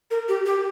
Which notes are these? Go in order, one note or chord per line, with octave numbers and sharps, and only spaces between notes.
A#4
G4
G4